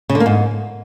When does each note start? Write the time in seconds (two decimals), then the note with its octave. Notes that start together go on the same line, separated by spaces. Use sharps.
0.09 C#3
0.15 D3
0.20 A#3
0.26 G#2